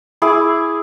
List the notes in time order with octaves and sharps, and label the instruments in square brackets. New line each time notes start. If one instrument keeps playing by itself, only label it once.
[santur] E4 G#4 D6